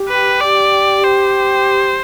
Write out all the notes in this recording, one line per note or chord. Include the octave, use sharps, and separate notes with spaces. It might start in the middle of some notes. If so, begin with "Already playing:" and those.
Already playing: G4
B4
D5
C5